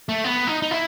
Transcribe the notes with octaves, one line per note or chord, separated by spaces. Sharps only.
A3
B3
D#4
D#4
E4